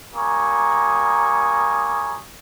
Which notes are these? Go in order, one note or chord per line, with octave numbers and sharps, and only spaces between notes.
G3 A#3 G#5 A#5 C#6 D#6